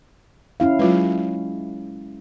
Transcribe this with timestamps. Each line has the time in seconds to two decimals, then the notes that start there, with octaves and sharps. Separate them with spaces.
0.60 C#4 E4 F5
0.79 F#3 G#3 F4 B4